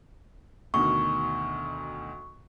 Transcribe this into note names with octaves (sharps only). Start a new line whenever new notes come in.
D2 B2 D#3 C#6